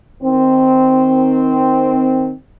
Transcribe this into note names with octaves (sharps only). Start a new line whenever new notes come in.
D#3 C4